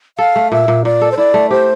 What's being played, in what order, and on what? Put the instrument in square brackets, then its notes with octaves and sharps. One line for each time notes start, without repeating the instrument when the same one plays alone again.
[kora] A4 [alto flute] F5
[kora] A3
[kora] A#2 [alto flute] E5
[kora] A#2
[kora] A#2 [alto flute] D5
[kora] A4
[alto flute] C5
[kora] E4 [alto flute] D5
[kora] A3
[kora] G4 [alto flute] C5